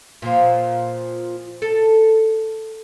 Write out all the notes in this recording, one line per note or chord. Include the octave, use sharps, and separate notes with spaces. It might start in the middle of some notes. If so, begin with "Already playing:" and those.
A#2 F3
A4